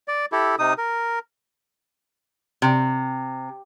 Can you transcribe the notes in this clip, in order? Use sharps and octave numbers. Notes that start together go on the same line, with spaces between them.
D5
E4 G4 A4
C3 D#4 D#6
A#4
C3